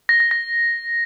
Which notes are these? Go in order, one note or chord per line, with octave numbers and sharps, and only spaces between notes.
A#6
A#6
A#6